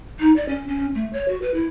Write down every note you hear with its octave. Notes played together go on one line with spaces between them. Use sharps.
D#4
D5
C#4
C#4
A3
C#5
F#4
B4
E4